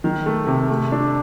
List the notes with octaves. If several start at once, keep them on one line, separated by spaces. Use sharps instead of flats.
D#3
A3
C3
A3
D4